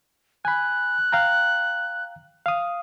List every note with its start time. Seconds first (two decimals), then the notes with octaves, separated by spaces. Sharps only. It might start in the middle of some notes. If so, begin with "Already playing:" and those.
0.45 G#5 B5 F#6
1.12 F5 G5 A#5
2.46 F5 D#6